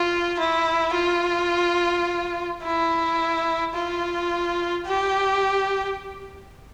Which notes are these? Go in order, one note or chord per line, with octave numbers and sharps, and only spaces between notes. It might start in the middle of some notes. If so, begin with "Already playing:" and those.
Already playing: F4
E4
F4
E4
F4
G4